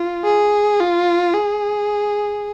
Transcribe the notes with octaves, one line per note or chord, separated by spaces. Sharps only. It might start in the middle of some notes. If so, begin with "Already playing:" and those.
Already playing: F4
G#4
F4
G#4